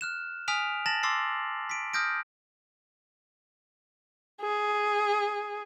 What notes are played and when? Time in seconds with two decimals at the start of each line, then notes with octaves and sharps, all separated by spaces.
0.01 F6 F#6 E7
0.48 G#5 D#6 F6 B6 D7 F7
0.86 A5 A6 A#6 E7 F#7
1.03 C6 D6 E6 A6 C7
1.70 B6 D7
1.94 D#6 F6 G6 A#6 D7
4.41 G#4